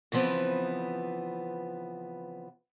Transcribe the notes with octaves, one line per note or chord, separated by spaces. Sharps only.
C#3 E3 F3 B3 C4